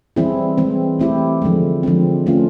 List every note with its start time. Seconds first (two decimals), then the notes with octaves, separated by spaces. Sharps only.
0.16 E3 G3 C4 E4 G#4
0.58 E3 G#3 C4
0.99 E3 A3 C4 E4 G4
1.42 D3 F3 G#3
1.83 D3 F3 G#3 C4
2.26 E3 A3 C#4 F4